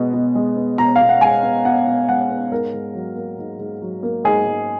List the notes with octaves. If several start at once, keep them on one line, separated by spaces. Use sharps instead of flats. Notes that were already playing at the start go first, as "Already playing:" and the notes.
Already playing: B2 G#3 B3
B2
G#3
B3
B2 A#5
B2 F5
F#5
G#3 G#5
B3
B2 F#5
B2
G#3 F#5
B3
G#2 A#4
G#2
F#3
A#3
G#2
G#2
F#3
A#3
G#2 G#4
G#2